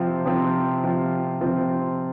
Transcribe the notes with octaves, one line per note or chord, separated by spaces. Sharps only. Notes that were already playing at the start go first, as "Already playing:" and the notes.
Already playing: C3 F3 C4 F4
C3 F3 C4 F4
C3 F3 C4 F4
C3 F3 C4 F4